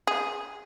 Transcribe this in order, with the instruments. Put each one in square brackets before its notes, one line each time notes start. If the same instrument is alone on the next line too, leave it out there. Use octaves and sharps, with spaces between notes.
[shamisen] G#4